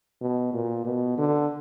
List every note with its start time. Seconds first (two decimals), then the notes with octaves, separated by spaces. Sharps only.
0.21 B2
0.54 A#2
0.85 B2
1.18 D3